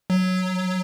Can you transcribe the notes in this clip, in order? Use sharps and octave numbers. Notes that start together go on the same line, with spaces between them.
F#3